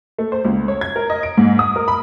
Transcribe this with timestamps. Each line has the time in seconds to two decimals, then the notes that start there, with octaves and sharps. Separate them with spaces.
0.18 A3
0.32 C5
0.45 C#2
0.68 C#5
0.81 G#6
0.96 A#4
1.10 D#5
1.23 D7
1.37 G#2
1.59 D#6
1.76 A#4
1.88 B5